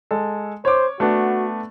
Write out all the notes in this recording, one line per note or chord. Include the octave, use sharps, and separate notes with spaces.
G#3 A4
C5 C#5 D6
A3 B3 D4 F#4